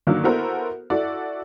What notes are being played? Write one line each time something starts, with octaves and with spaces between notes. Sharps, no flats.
D3 D#3 F#3 A#3
B3 E4 F#4 A4 A#4 C5
E4 F#4 A4 D5